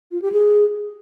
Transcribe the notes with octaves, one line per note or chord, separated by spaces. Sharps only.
F4
G4
G#4